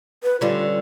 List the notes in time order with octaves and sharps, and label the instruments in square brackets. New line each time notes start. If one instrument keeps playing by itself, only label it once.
[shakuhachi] B4
[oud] D3 G3 C#4 [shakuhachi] F4